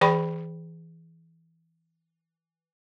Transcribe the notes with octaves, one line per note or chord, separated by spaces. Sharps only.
E3 G#4 D5 G5 B5 C#6